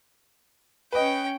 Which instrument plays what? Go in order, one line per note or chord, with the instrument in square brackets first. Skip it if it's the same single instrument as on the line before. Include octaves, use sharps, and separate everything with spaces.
[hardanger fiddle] C#4 G5 [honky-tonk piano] B4 D#5